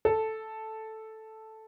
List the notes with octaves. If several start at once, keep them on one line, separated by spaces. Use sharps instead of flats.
A4